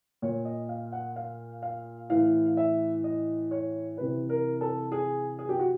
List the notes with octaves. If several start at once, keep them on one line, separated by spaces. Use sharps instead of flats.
A#2 C#5
D#5
F5
F#5
F5
F5
A2 E3 F5
E5
D#5
C#5
C3 E3 B4
A#4
A4
G#4
G#4
G4
F#4